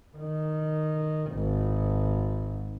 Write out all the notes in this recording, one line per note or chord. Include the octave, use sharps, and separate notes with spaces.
D#3
G#1